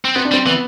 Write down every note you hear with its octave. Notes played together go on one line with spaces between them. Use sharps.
C4
B3 C4
D4
G3 C4
E3 B3